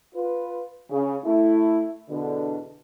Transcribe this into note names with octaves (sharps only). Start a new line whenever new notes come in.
F4 B4
C#3
A3 E4
E2 B2 D3